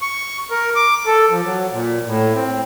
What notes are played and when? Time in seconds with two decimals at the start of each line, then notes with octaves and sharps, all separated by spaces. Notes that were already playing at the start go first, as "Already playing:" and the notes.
0.02 C#6
0.51 A#4
0.76 D6
1.06 A4
1.30 F3
1.44 F#3
1.73 A#2
2.06 A2
2.35 C4